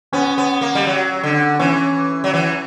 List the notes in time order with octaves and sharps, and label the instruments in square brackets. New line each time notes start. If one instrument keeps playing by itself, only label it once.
[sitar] B3 [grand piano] C#4
[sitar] B3
A#3
G3
F#3
D3
[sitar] E3 [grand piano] C#4
[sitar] F#3
E3